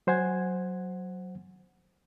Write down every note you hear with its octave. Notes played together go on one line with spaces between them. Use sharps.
F#3 C5 F#5 G#5 G#6